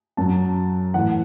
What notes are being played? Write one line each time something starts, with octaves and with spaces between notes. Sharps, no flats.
F#2 F#3 A5
A2 E3 F#5